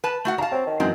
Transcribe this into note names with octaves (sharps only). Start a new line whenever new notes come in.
B4 A5
A3 F#4 F#5
D4 F5 A5 A#5
C4 C#5
D#3
F#2 E3 F#3 G#3 C4